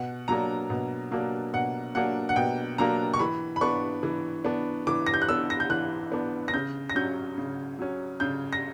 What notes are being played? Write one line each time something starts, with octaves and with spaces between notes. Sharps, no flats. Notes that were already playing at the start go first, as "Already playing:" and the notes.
Already playing: B2 F#5
F#3 A#3 D4 A#5
B2
F#3 A#3 D4
B2 F#5
F#3 A#3 D4 F#5
F#5
B2 G5
F#3 A#3 D4 A#5
C#6
E3 B5
B5
B3 D4 C#6
E3
B3 D4
E3 D6
A#6
G6
F#6
B3 D4 E6
A#6
G6
E3 F#6
B3 D4
A#6
C#3 G6
A#6
F#3 C#4 G6
C#3
F#3 C#4
C#3 G6
A#6